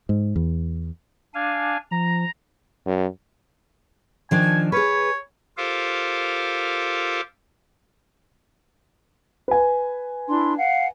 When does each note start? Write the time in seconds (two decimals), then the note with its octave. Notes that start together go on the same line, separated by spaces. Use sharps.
0.09 G#2
0.36 E2
1.35 D4 F5 G#5
1.91 F3 A#5
2.86 F#2
4.31 D#3 F3 D4 G#5
4.72 G#4 B4 C#5
5.57 F4 G4 A4 A#4 C5 F5
9.48 B4 G#5
10.29 D4 E4 C6
10.57 F5 F#5